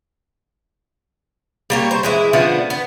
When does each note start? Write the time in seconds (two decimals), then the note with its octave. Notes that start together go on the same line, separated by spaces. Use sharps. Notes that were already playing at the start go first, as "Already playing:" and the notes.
1.70 G3 A#3 C#5
1.91 C5
2.03 E3 G#3 E4
2.33 D3 F3 A3 B3
2.70 B3